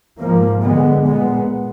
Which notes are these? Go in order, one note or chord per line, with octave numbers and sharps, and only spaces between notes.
G#2 F3 A#3
D3 G#3 B3
A#2 G#3 B3